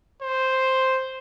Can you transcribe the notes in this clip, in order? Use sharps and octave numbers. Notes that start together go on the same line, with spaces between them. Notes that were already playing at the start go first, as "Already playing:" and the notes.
C5